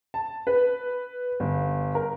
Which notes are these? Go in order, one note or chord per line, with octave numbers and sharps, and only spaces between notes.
A5
B4
G1
A#4